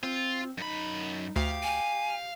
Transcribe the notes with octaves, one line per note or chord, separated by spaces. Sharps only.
C4 F4
F#2 D#4 B5
D2 G4 F5
G#5